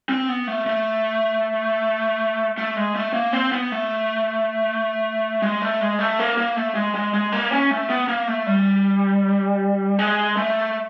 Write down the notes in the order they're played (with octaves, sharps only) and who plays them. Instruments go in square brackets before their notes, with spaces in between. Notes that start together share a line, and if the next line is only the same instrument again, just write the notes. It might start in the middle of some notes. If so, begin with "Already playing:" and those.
[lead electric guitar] C4
B3
A3
A3
A3
G#3
A3
A#3
C4
B3
A3
G#3
A3
G#3
A3
A#3
A#3
A3
G#3
G#3
G#3
A#3
C#4
A3
B3
A#3
A3
G3
G#3
A3